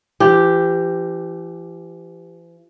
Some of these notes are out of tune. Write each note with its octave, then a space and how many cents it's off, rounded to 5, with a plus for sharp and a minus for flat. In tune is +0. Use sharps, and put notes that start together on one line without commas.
E3 +45 G4 +0